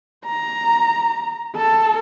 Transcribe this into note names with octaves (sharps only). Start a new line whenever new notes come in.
A#5
A4